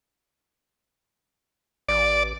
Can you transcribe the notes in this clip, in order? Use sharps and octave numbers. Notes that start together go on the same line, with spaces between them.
A1 D5